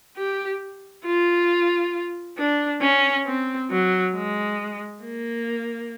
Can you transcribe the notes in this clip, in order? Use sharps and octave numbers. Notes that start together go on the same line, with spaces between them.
G4
F4
D4
C#4
C4
F#3
G#3
A#3